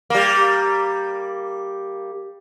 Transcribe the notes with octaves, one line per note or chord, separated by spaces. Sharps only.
G3 A#3